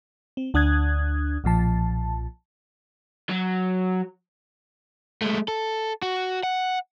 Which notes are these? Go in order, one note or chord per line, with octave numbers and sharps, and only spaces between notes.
C4
D2 D4 D#6 F#6 G#6
B1 A#2 F3 A5
F#3
G#3 A3
A4
F#4
F#5